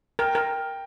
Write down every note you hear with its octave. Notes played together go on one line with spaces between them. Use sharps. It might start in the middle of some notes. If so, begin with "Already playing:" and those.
A#4 G5
A#4